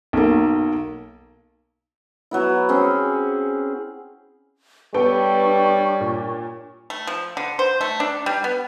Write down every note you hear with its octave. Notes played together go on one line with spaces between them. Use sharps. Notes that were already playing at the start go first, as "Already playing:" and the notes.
B1 A#3
F#3 B3 E4
C4 C#4 G#4
G3 B3 D4 A4 C#5 G5 C#6
A#2
A3
F3
D3
C5
A3
D4
G3
B3